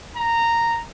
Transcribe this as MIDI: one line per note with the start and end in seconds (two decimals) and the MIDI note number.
0.17 0.82 82